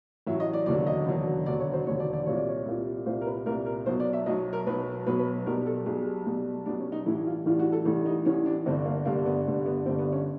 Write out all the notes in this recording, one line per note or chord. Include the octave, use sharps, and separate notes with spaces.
A1 A2 F#3 E5
D#5
D5
E1 D#2 D3 F#3 D5
D#5
E1 D#2 D3 F#3
E1 D#2 D3 F#3 D5
C#5
C5
E1 D#2 D3 F#3 C#5
D5
D5
C2 A#2 G3 C#5
D5
C#5
C2 A#2 G3
C2 A#2 G3 C5
A#4
B4
C2 A#2 G3 A#4
A#4
B1 B2 F#3 C5
D5
E5
B1 B2 F#3 D#5
A#4
B1 B2 F#3 B4
B1 B2 F#3 B4
B4
B1 B2 G3 A#4
A4
B1 B2 G3 G#4
B1 B2 G3
B1 B2 G3 D4
C#4
D#4
A1 A2 E3 G3 E4
F4
A1 A2 E3 G3 F4
F#4
A4
A1 A2 E3 G3 A4
D#4
A1 A2 E3 G3 C#4
D4
G1 G2 D3 G3 C4
A#3
G1 G2 D3 G3 A#3
B3
G1 G2 D3 G3
B3
G1 G2 D3 G3 C4
B3
C#4